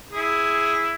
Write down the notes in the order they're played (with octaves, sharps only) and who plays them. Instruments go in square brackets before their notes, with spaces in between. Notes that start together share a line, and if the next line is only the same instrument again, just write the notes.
[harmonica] E4 G#4